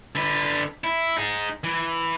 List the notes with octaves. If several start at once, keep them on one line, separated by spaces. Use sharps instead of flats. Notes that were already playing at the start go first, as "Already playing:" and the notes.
D3 B4
E4
D#4 G#4
E3